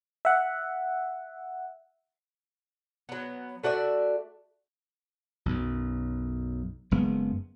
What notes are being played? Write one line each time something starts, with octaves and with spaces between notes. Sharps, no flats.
E5 F#5
F#3 B3
A3 F#4 D5 E5
B1 F#2
F#1 F#2 G#3 B3